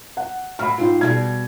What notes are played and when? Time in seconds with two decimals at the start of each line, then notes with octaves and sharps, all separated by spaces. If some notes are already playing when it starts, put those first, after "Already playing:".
0.17 F#5
0.59 A2 F#3 F#4 B5 F6
0.78 G#2 C4 D#4 F4
1.01 B2 G3 G#4 G#6